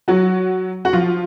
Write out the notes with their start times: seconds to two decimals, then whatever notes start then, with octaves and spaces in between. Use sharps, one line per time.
0.08 F#3 F#4
0.85 F#4
0.93 F3 F4